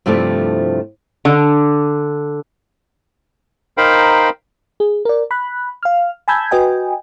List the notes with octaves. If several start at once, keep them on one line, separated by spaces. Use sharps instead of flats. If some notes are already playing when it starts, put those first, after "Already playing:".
G2 C3 F3 A3 E4 D5
D3
D#4 A#4 C5 F5 G5 B5
G#4
A#4 D5
B5 F#6
F5 F6
G#5 A5 B5 E6 G6 G#6
F#4 B4 D#5 G5 G#5